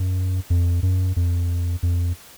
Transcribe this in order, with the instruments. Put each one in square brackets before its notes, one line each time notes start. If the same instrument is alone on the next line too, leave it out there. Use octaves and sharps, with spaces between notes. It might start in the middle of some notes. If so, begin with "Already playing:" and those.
Already playing: [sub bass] F#2
F2
F#2
F2
F2